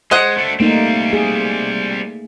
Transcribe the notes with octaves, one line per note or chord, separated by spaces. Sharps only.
G#3 C5 D#5 F#5
A3 D4
G3 A3 A#3 C4 D#4
G#4